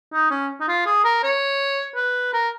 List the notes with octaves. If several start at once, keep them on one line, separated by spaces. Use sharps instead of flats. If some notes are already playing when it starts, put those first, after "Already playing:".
D#4
C#4
D#4
F4
G#4
A#4
C#5
B4
A#4